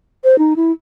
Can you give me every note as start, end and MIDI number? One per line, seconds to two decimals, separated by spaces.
0.24 0.38 72
0.39 0.53 63
0.56 0.72 64